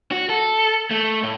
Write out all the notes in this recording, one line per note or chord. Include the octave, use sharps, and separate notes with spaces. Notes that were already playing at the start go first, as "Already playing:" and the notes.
F#4
A4
A3
A2